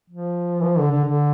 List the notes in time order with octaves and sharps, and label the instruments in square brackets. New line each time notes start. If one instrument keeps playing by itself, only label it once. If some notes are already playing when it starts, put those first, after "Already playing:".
[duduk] F3
E3
F3
D3
D3
D3